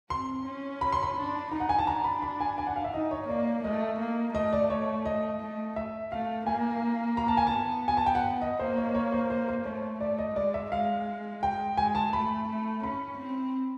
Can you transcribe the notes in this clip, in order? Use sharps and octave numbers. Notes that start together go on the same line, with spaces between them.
C4 C6
C#4
B5
C6
B5
D4
D#4 A#5
F#5
G#5
A5
D4 A#5
B5
B5
G#5
G#5
F#5
F5
E5
D#4 D#5
C#5
A#3 D5
A3 D#5
A#3
A3 D#5
D5
C#5
D#5
A3
E5
A3 F5
A#3 G#5
A#5
A5
G#5
A5
B3
G#5
A5
G5
F#5
D#5
A#3 C5
C#5
C#5
C5
C5
C5
A3 C#5
A3 D5
D#5
G#3 D5
E5
G#3 F5
G5
G#3 G#5
A5
A3 B5
A3
C#4 B5
C4